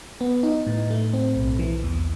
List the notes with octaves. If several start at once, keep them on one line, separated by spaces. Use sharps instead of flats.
B3
D#4
A2
A3
C4
B1
E3
E2